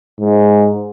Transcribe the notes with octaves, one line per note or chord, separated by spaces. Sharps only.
G#2